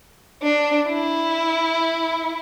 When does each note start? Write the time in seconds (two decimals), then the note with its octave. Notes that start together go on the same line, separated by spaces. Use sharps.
0.42 D4
0.89 E4